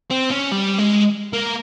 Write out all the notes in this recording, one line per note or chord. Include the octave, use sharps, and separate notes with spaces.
C4
C#4
G3
G#3
A#3